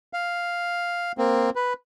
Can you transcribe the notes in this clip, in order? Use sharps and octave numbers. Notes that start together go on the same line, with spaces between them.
F5
A#3 C4
B4